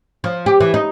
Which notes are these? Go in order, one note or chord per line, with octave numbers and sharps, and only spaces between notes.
F3
G4
E3
D#4